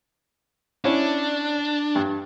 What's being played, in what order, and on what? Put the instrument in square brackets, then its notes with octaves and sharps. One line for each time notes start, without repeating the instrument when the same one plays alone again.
[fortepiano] C#4 E4 [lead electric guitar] D4
[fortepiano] G2